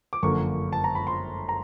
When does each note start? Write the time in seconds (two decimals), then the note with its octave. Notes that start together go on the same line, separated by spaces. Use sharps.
0.13 D6
0.23 G1 F#2 D3 F3 A#3 C#6
0.73 A5
0.84 A#5
0.95 B5
1.07 C6
1.49 A#5